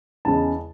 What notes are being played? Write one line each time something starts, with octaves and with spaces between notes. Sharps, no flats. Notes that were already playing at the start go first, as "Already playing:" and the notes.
E2 C#3 G#3 A5